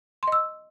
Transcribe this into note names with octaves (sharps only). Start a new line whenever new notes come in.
D#5 C6 E6